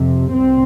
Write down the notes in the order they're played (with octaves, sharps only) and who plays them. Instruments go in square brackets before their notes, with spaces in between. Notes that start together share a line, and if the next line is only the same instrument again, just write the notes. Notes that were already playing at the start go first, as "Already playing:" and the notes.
Already playing: [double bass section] F2 C3
C2 C4